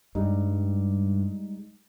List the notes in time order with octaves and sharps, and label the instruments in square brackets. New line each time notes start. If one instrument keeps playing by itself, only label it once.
[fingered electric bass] G2 [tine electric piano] G3 G#3 D#4